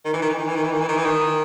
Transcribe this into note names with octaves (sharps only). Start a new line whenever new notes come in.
D#3
E3
D#3
E3
D#3
E3
D#3
E3
D#3
E3
D#3
E3
D#3